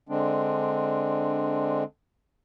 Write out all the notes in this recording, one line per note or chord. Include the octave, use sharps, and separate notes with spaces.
D3 G#3 C4 D4